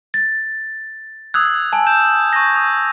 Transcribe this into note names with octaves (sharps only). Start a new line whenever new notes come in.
A6
D#6 E6 F#6 G#6
G#5 A5
G6 E7
C#6 G6 A#6
D#6